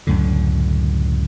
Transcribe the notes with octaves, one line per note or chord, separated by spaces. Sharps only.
C#2 F#2 A2 D3